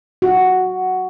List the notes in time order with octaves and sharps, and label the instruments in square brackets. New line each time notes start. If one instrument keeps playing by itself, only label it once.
[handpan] F#4